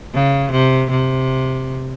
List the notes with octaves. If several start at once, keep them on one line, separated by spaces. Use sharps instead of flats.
C#3
C3
C3